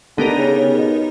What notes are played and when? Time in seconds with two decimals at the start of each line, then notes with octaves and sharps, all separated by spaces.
0.18 D3 B3 D#4 G4 A#4
0.38 C#3
0.58 C#3
0.78 B2